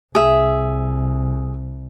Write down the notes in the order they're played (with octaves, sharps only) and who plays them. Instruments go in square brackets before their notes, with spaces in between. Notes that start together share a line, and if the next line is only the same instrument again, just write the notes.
[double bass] C2 [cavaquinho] G#4 E5